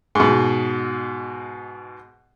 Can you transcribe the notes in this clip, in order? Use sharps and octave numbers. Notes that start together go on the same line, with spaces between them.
G#2 B2